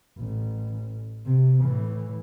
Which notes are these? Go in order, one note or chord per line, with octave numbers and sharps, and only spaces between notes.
A1
C3
A2 E3